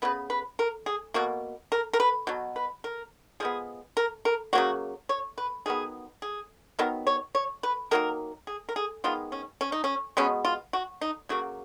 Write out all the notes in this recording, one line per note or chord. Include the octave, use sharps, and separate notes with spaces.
C#3 G#3 B3 B4
B4
A#4
G#4
B2 A#3 F#4
A#4
A#4
B4
B2 F#3
B4
A#4
F3 G#3 B3 G#4
A#4
A#4
C#3 F#3 A#3 F#4
C#5
B4
D#3 F#3 B3 G#4
G#4
D#3 F#3 B3 A#4
C#5
C#5
B4
D#3 F#3 A#3 A#4
G#4
A#4
G#4
D#3 G#3 B3 F4
C#4
C#4
D#4
C#4
B2 G#3 B3 C#4
F4
F#4
D#4
C#3 F#3 A#3 F#4